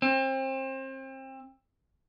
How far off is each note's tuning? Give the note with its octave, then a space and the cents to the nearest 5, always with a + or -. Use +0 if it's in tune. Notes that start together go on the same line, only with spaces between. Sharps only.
C4 +30